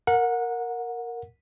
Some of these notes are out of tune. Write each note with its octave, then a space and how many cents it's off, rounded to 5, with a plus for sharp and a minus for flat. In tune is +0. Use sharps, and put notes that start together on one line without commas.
A#4 -5 F#5 -25